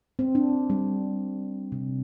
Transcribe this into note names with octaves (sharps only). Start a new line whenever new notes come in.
C4
D4
G3
C3